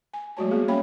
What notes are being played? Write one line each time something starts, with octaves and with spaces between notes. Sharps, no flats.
G#5
F#3 G#3 A3 F#4 C#5 A5
G3 G#3 A#3 B3 G#4
C#4 C#5 E5 F5 G5 B5